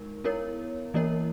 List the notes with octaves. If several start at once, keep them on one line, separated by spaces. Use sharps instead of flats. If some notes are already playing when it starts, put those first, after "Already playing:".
Already playing: G#3 D#4 A#4
B3 E4 A#4 C#5
E3 A#3 E4 A#4 C#5